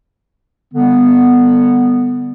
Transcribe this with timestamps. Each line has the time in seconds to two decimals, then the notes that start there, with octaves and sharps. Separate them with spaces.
0.73 D3 G3 B3